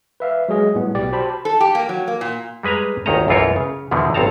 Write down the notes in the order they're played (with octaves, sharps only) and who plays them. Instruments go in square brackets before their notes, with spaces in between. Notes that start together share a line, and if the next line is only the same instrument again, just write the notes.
[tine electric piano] B4 E5 F5
F#3 G#3 G#4 D#5
A2 G3 B3
B1 B2 G4 D5
F#4 G4 C5 A5 B5
[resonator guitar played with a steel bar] A4
G4
A#3
F#3
A#3
A#2
[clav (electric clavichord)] G3 G#3 B4 G#5 A#5
G1 D2 D#3 C#5 D#5 A#5
B1 F#2 E3 F4 A#4 C#5
C#3
E2 B2 D3 D#3 F3
A1 G2 C4 C#5 A5 A#5